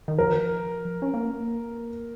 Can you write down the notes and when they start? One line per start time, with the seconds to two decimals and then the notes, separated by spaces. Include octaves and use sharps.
0.08 D#3
0.18 F3 A#4
1.02 C#4
1.14 A#3